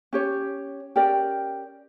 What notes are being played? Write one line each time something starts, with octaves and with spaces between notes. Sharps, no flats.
C#4 G4 C#5
C#4 G4 A#4 D5